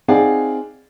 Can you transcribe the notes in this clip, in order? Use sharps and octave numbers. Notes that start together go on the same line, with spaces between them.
C4 D#4 G#4 D5 F5 F#5